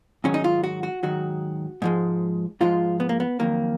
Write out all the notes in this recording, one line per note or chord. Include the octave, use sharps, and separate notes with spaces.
G#2 D#3 F#3 C#4
D#4
F4
F#4
F#4
G#2 D#3 F#3 F#4
G#2 F3 G#3
G#2 F3 G#3 F4
B3
A#3
B3
F2 D#3 F#3 A#3